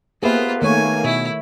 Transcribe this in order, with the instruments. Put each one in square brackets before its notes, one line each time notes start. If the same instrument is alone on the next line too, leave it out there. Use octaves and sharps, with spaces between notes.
[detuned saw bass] A#3 [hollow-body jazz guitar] B3 G4 E5 [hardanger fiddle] F4 C5 [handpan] G#4 B4
[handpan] D#3 A3 C#5 [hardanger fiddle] G#5
[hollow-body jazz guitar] B2 [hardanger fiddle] E4